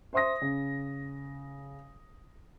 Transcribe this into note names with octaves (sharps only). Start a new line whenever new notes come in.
C5 E5 C6 D#6 A#6
C#3